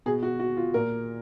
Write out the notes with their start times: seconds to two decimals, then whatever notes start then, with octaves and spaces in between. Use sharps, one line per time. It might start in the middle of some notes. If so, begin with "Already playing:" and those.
0.06 B2 G#4
0.23 F#4
0.40 F#4
0.57 F4
0.74 A#2 A#4